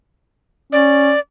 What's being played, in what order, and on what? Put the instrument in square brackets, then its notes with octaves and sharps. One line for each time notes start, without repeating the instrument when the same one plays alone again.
[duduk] C#4 [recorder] D5